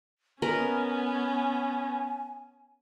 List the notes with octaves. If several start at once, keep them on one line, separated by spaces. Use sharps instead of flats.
B3 C#4 A#4 B4 D#5 G#5